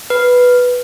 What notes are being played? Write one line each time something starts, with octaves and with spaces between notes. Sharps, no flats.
B4